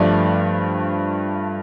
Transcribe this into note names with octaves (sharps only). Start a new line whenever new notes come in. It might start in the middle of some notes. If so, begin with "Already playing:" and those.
Already playing: G2 F3 A3 D5